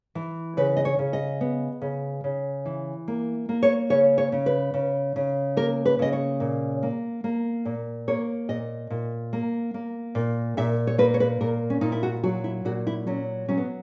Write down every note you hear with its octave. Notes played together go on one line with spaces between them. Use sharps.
E3
C#3 B4
D#5
C#5
C#3
D#5
B3
C#3
C#3
E3
A#3
A#3
C#5
C#3 C#5
C#5
C#3
B4
C#3
C#3
A#3 A#4
B4
C#3 D#5
C#5
A#2
A#3
A#3
A#2
A#3 C#5
A#2 D#5
A#2
A#3
A#3
A#2
A#2 E5
C#5
A#3 B4
C#5
B4
A#2 A#4
C#4
A#2 D#4
E4
F#4
F#3 F#4
E4
A#2 F#4
E4
F#3 C#4
F#3 C#4
B3